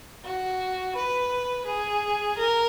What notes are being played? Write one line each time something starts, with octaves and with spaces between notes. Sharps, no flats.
F#4
B4
G#4
A#4